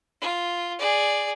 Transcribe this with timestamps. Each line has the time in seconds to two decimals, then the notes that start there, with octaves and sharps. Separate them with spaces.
0.22 F4
0.79 G#4 D5